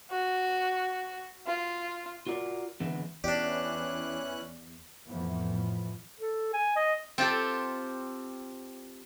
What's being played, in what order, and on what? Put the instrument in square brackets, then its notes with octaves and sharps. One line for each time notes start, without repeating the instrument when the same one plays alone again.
[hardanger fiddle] F#4
F4
[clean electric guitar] F4 F#4 A#4 D5
D3 E3 G#3 B3 C4
[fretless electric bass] E2 [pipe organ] E3 C#4 F#6 [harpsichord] D4 G4 [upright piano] D5
[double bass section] F2 A2 E3 F3 B3
[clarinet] A4
G#5
D#5
[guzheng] C4 F4 G4 A4